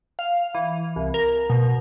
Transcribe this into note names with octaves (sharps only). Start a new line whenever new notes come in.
F5
E3
C2
A#4
B2